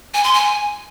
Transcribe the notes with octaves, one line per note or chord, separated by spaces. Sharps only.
G#5
C6
G#5